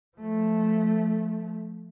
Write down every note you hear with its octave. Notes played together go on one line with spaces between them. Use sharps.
F3 A3